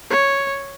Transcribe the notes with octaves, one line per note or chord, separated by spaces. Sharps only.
C#5